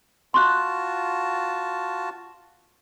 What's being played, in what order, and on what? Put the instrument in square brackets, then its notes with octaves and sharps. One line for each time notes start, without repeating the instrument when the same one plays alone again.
[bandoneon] F4 F#4 A5 [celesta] C6 C#6 F#6